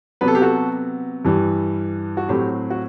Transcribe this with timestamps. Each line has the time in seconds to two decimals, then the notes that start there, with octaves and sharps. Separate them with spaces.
0.21 C3 F#3 B3 B4
0.28 A4
0.35 G4
0.42 F#4 A4
1.25 G2 E3 G3
2.17 F#4
2.28 A2 F#3 C4 G4
2.70 F#4